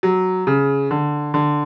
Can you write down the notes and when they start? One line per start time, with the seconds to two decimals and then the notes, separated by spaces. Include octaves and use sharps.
0.03 F#3
0.47 C#3
0.91 D3
1.34 D3